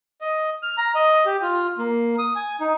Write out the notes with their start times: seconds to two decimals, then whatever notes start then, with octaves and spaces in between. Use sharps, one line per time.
0.21 D#5
0.63 F6
0.78 A#5
0.95 D#5
1.26 G4
1.42 F4
1.78 A#3
2.19 D#6
2.36 G#5
2.60 D#4